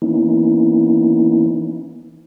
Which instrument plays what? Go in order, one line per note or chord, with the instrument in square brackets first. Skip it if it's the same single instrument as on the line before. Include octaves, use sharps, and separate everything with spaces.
[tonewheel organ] E3 A#3 B3 C#4 D#4 E4